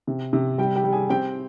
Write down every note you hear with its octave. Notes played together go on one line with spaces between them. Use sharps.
C3
C3
G3 G4 G5
G4 G5
G3
G#4 G#5
C4 G4 G5